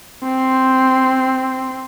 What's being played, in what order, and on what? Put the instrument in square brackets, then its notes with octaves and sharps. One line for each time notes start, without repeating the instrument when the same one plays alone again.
[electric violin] C4 C6